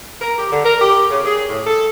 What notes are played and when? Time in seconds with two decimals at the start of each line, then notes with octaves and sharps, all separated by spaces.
0.21 A#4
0.38 G4
0.51 D3
0.64 A#4
0.81 G4
1.10 C#3
1.25 G#4
1.48 A2
1.66 A4